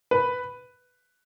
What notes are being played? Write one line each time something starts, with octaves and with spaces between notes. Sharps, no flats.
B4